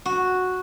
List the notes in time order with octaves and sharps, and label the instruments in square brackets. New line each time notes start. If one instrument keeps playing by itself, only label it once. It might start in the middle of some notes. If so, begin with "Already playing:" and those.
[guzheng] F#4